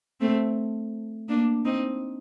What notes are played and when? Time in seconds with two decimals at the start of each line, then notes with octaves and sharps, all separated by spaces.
0.20 A3 C4
1.29 A#3 D4
1.65 C4 D#4